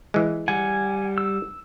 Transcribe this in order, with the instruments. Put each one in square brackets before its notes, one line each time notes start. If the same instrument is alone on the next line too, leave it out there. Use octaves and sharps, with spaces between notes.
[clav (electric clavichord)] E3 G#3
[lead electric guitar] G3 F#5 [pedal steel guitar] G#5
[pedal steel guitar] E6